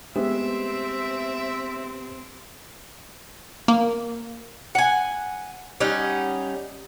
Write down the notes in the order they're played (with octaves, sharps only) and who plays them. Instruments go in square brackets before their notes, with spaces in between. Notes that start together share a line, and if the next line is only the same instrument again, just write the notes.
[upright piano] G#3 A3 B3 [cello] C4 [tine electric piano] G4 [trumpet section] E5
[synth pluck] A#3
[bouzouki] F#5 G#5
G3 C#4 D#4 F#5